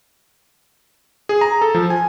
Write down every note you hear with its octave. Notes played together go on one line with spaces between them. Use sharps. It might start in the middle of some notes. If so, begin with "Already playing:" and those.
G#4
A#5
A4
F3
G#5